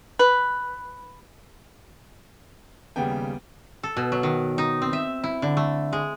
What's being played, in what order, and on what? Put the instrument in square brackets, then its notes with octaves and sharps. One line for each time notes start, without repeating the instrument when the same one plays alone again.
[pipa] B4
[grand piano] D#2 C#3 G3 [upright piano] B3 G5
[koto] A4
B2
F#3
D#3
D#4
C4
E5
E4
D3
A3
G#3